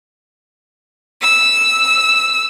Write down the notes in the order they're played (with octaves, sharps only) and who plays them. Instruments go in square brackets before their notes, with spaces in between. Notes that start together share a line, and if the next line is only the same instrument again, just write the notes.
[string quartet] E6